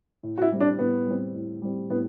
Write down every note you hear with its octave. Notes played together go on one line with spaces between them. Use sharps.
A2
F#4
E4
G3 C4
D4
A2 B3
G3 C4
A2
G3 C4
A2 B3